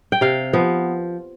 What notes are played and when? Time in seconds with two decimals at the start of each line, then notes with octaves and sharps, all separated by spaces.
0.12 G5
0.21 C3 F5
0.53 F3 B3